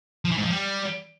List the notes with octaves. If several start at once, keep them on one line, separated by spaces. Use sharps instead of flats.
F3
E3
G#2
F3
G3